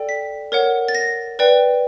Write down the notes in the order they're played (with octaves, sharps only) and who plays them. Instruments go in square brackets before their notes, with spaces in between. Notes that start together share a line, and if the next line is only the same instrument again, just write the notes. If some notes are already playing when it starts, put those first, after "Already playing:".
Already playing: [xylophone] A4 D5 G5
B6
A#4 C#5 F#5
A6
A#6
B4 D5 G5